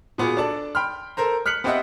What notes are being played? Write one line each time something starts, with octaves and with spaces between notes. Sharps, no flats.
A#2 B3 F4 F#4 G#4
D4 A4 D5 A5
G5 B5 C6 F6
A4 A#4 C5 A#5
F6 F#6 B6 C#7 F#7
B3 C4 G4 D#5 E5 F#5